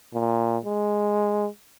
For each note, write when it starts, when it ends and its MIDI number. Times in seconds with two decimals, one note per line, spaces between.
0.14 0.58 46
0.65 1.48 56